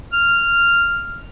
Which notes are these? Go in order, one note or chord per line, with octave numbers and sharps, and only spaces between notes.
F6